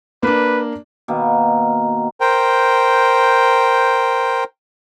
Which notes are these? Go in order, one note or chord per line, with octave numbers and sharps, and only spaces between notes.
A#3 D4 B4
B2 D#3 A#3
A#4 C5 G5